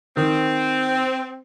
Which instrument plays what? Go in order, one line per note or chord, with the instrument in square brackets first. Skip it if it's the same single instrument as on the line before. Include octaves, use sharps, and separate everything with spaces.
[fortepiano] D#3 [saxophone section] C4